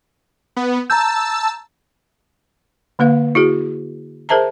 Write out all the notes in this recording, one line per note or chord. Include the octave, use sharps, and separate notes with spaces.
B3
A5 A#5 E6 G6
D3 A#3 B4 F5
E4 F#4 G#4
G#4 A#4 C5 E5 A5 A#5